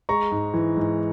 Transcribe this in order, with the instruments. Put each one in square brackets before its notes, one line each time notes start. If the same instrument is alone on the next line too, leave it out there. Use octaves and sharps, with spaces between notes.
[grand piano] G#3 A#5 C#6
G#2
E3
G#2